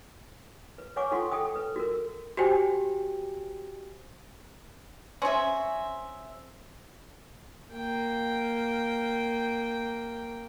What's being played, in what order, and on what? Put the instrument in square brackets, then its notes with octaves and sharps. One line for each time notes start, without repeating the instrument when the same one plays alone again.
[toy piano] B4
B4 C#5 F#5 G#5 C#6 D6
F4 A4 F#5 G5 C6 C#6
A4 G5 D#6
B4
F#4 A#4
[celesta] F#4 G4 C5 G5 G#5
[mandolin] C4 E5 [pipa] C#4 G#4
[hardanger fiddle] A#3 G5